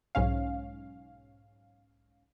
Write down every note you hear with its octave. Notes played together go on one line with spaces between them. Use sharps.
B1 G#2 C#4 F5